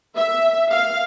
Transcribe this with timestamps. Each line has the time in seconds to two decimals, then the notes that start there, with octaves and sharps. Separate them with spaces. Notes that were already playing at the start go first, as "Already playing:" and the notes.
0.16 E5
0.72 F5